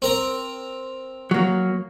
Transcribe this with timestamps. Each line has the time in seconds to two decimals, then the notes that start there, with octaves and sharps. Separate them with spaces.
0.02 C4 A#4 A#5
1.31 F#3 A#3